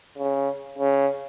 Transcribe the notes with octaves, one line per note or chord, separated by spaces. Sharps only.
C#3
C#3